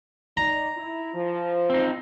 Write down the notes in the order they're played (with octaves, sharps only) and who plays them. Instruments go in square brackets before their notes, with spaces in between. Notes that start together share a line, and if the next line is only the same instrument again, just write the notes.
[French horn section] D#4 D5 [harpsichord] A#5
[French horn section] E4
F3
[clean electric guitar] C4 D#4